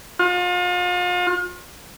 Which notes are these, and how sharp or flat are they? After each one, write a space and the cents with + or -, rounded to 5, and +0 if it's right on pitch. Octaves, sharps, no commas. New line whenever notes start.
F4 +40